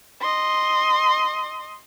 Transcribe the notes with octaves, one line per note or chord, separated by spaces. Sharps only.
D#5 C6